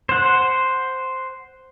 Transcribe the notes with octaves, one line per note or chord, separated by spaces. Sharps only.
C5 F#5